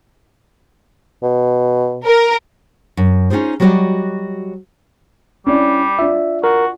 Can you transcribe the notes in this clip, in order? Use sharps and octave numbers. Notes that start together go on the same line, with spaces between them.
B2
A#4
F#2
C#4 D#4 F4 G#4 C5
F#3 G3 F#4 A#4 D5 D#5
G3 C#4 D4 E4
D4 F4 E5
F#4 A#4